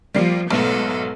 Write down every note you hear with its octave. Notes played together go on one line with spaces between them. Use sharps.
F3 G3 A#3 C7
B1 G#2 A3 B3 A4